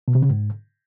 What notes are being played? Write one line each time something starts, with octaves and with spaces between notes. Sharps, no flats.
B2
C3
C#3
G#2